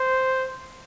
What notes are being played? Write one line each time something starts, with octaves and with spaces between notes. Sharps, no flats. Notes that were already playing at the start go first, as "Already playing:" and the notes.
Already playing: C5